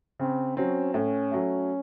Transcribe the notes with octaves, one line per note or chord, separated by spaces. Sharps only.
C#3 C4
F#3 C4 C#4
A2 C#4
F#3 A3